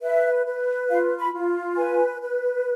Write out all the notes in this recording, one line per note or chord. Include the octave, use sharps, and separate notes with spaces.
B4 E5
B4
F4 F5
B5
F4
B4 G#5
B4